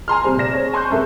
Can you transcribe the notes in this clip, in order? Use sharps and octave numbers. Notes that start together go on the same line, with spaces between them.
G#5 A#5 C6 F6
C3 G3 C5
F1 C5 D5 A#6 E7
G#4 C5 C#5
G#5 C6 C#6 F#6 G6
F#2 C3 G#3 A4 A#4 E5